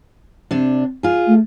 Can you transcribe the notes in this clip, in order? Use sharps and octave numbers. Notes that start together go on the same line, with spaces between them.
C3 D4
F4 G#4
A3